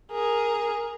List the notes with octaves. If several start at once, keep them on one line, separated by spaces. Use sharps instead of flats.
G#4 A#4